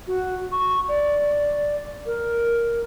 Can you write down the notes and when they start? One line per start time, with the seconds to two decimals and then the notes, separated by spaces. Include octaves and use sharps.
0.08 F#4
0.52 C#6
0.88 D5
2.06 A#4